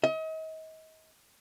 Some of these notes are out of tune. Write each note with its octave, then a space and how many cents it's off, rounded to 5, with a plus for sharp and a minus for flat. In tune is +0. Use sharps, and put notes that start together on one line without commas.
D#5 +35